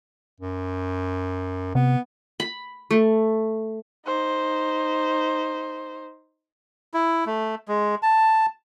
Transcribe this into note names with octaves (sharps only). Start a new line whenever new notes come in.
F#2
C3 B3
B5
A3
D#4 C5
E4
A3
G#3
A5